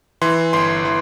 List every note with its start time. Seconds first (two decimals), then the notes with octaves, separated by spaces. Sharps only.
0.21 E3 C6
0.53 G1 C6
0.85 E3